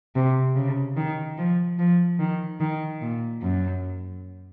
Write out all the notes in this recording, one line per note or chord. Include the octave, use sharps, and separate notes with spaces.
C3
C#3
D#3
F3
F3
D#3
D#3
A#2
F#2